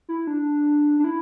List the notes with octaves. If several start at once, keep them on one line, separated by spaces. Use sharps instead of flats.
E4
D4
D4
E4